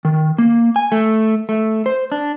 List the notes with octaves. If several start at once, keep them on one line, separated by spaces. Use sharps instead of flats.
D#3
A#3
G#5
A3
A3
C5
D4